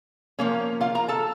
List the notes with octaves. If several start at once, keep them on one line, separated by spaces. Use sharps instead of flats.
F3 A#3 C#4
F4 F5
A#4 A#5
A4 A5